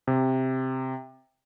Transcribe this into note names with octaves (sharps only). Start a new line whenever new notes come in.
C3